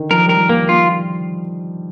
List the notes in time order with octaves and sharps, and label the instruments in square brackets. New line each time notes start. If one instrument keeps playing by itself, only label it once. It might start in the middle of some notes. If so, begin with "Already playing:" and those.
Already playing: [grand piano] D3 D#3
[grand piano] F3 [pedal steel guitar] A#4
[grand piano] G3
[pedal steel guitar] A#4
[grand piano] F3
[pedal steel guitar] A#3
F4